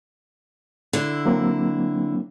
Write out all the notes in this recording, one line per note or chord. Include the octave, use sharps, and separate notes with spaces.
D3 E4
F#3 A#3 C4